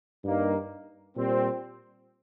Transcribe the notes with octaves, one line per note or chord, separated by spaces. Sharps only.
G2 G3 A#3 D#4
A#2 G3 C4